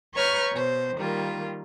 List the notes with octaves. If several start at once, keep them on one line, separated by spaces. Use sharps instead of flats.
B4 C#5 A#5 C#6 F6 G6
B2 C5
D#3 G3 A#3 F4